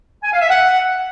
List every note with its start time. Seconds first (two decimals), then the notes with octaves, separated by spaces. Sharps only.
0.24 G#5
0.32 F5
0.41 E5
0.50 F#5